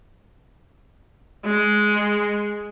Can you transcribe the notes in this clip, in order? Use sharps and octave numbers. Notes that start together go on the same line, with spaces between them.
G#3